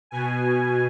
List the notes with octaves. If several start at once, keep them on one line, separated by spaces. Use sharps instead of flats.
B2 G#5